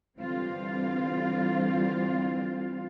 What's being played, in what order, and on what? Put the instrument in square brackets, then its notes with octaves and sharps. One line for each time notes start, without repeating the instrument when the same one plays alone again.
[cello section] D3 E3 G3 C4 F4 F5